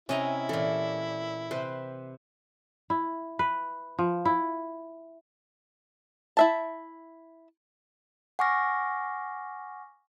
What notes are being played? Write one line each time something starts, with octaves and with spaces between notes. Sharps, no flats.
C3 C#4 E4 D#5 A#5
A#2 E3 A4
C3 B4 C5
E4
B4
F3
E4
E4 E5 A5
F#5 G#5 C#6 D6 F6 A#6